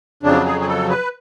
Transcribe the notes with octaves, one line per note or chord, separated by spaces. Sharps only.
F2 C#3 F#3 D4
G#4
G#4
A4
B4